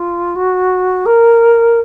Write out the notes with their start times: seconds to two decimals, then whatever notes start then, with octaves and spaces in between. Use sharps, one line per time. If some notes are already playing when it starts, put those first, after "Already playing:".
Already playing: F4
0.35 F#4
1.05 A#4